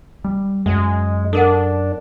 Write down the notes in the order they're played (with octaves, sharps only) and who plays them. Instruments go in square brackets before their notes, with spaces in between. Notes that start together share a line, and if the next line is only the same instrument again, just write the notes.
[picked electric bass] G3
[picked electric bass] F#2 [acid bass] G#3
[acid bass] D4 [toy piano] A4 A#4 F#5